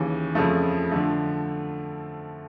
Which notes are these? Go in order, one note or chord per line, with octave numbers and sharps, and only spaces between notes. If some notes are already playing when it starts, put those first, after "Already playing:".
Already playing: D#2 C#3 E3
F2 C#3 F3 A3
D3 F3 A3